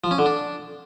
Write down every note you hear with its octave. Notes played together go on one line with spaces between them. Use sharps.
F3
C#4
D3
D4